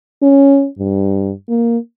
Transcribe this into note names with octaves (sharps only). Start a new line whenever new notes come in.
C#4
G2
A#3